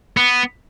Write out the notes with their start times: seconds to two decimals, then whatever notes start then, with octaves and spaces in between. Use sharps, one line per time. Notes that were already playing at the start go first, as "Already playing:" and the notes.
0.17 B3